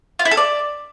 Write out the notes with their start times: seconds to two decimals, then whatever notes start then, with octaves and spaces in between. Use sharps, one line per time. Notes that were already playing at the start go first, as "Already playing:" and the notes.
0.19 F4
0.25 E4
0.31 A4
0.37 D5